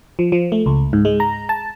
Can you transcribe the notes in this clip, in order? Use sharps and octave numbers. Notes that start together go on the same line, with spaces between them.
F3
F3
A3
C#2
G#2
G#3
A#5
A5